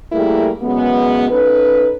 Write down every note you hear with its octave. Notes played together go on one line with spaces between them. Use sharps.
G3 A3 A#3 E4 G#4 A#4
F#2 C#3 G#3 B3
C#4 D#4 A4 B4